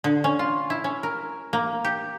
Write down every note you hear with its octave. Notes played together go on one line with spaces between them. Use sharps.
D3
C#4
F4
E4
C#4
A#4
A#3
G4